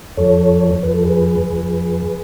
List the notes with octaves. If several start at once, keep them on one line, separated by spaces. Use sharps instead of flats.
F2 F3 A4 C#5
F2 F3 B4
A4
G#4 B4
F2 F3